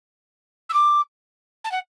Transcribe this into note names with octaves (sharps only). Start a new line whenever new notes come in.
E6
D6
A5
F#5